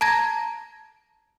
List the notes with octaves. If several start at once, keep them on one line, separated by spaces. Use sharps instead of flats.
A5 A#5 G#6 A#6